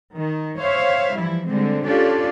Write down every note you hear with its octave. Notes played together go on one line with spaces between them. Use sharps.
D#3
C5 C#5 E5 F5
E3 F3 G3 E4
D3 G3 G#3 C4
C#4 D4 F4 G4 A4 D5